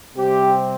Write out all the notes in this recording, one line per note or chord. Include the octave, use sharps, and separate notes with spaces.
C3 G3 C4 G4